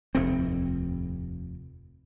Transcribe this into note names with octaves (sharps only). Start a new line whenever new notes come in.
F1 D#2 A2 C4